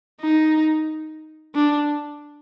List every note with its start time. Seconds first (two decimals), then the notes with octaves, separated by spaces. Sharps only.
0.21 D#4
1.55 D4